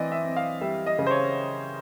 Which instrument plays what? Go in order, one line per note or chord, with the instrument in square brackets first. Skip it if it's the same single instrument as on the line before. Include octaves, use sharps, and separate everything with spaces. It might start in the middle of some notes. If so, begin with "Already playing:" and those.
Already playing: [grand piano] E3 C4 D5 D#5
E5
C4
F5
G3 E5
D#5
C#3
C5
C#5